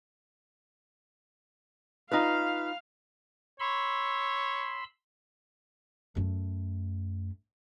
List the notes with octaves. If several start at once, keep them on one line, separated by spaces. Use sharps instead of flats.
D#4 F4 B4 F5
C#5 B5 C6 E6
F#2 A3